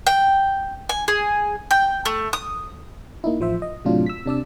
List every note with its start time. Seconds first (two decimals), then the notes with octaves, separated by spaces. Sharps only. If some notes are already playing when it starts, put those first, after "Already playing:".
0.07 G5
0.89 G#5
1.08 G#4
1.71 G5
2.05 A3
2.33 D#6
3.24 A#3 D#4 E4
3.40 A1 F3 C5 E5
3.62 D#5
3.85 A2 C3 F#3 D4 F4
4.06 E6 B6
4.26 C3 D4 D5 E6